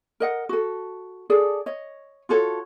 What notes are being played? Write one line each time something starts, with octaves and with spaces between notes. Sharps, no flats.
A#4 D#5 F#5
F#4 A4
G#4 A4 D5
C#5 D#5
F4 F#4 A4 C#5